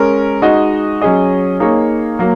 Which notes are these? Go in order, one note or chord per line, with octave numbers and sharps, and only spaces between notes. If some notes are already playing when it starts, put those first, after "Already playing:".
Already playing: G#3 C#4 A#4
G#3 D#4 F#4 D#5
F#3 C#4 G#4 D#5
A#3 D#4 G#4 C#5
F#3 A#3